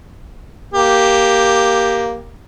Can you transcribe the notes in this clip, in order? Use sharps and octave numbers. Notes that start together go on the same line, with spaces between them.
A#3 G4